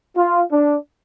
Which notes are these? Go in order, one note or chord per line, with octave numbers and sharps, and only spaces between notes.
F4
D4